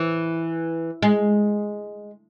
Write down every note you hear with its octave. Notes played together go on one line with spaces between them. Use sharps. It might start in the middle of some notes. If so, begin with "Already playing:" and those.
Already playing: E3
G#3